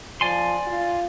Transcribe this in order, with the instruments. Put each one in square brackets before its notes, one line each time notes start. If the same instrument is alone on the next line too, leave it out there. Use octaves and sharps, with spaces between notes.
[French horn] F3 [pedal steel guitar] D5 G#5 C6
[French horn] F4